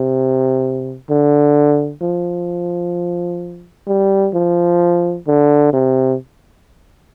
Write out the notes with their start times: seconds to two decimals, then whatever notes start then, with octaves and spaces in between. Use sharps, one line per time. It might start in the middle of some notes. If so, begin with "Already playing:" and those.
Already playing: C3
1.10 D3
2.02 F3
3.87 G3
4.34 F3
5.27 D3
5.73 C3